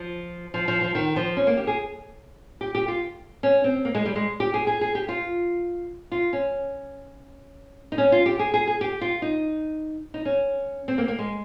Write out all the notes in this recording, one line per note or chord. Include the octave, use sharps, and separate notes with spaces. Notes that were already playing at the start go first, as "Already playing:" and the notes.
Already playing: F3
F3
F3
F3
D#3
F3
C#4
A#3
G4
G#4
G4
G4
F4
C#4
C4
A#3
G#3
G3
G#3
G4
G#4
G#4
G#4
G4
F4
F4
C#4
D#4
C#4
F4
G4
G#4
G#4
G#4
G4
F4
D#4
D#4
C#4
C4
A#3
A#3
G#3